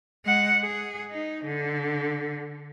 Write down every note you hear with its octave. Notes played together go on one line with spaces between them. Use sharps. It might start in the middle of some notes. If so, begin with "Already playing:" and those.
G#3 F#5
G#4
D#4
D3